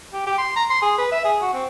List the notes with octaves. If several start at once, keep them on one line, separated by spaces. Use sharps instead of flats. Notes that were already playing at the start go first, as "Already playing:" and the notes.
G4
G4
C6
A#5
C6
G#4
B4
E5
G#4
F#4
C4